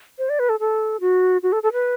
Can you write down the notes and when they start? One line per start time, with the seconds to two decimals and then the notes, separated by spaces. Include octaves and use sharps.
0.18 C5
0.29 D5
0.39 B4
0.49 A4
0.60 A4
1.00 F#4
1.43 F#4
1.52 A4
1.63 A4
1.73 B4